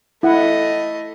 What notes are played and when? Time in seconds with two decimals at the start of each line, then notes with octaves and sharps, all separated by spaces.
0.23 A3 E4 D#5 F#5